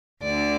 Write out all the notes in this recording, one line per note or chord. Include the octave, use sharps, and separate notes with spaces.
D2 D3 D5